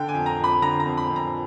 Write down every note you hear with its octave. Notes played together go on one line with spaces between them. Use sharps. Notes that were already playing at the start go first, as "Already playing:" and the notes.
Already playing: D3 G5
G#5
F2
A#5
F2 B5
D3 A#5
A#5
F2
B5
F2
A#5